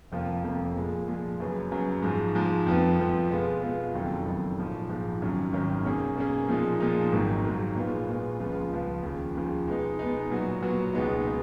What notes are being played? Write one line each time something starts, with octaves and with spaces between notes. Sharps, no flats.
F1 F2 F3 A#3 F4
F1 F2 F3 A#3 F4
A#2 F3 G#3
A#2 F3 G#3
F#2 C#3 F#3 B3
F#2 C#3 F#3 B3
G#2 F3 G#3
G#2 F3 G#3
F2 F3 B3
F2 F3 B3
B2 G#3 B3 F4
B2 G#3 B3 F4
F#1 F2 D#3 F#3
F#1 F2 D#3 F#3
A#1 G#2 F3
A#1 G#2 F3
G#1 F#2 D#3 F#3 C#4
G#1 F#2 D#3 F#3 C#4
B2 A#3 C#4 G#4
B2 A#3 C#4 G#4
A#2 F3 G#3 D#4
A#2 F3 G#3 D#4
G#1 G#2 F#3 A#3
G#1 G#2 F#3 A#3
A#1 A#2 G#3 B3 F4
A#1 A#2 G#3 B3 F4
C#2 C#3 F3 B3 F4
C#2 C#3 F3 B3 F4
D#2 C#3 F3
D#2 C#3 F3
B2 G#3 B3 D#4
B2 G#3 B3 D#4
A#2 F#3 B3 F#4
A#2 F#3 B3 F#4
C#2 B2 G#3 B3 D#4
B3 D#4